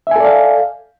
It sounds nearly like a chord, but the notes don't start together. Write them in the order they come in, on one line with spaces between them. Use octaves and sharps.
E5 G#5 A4 D5 F5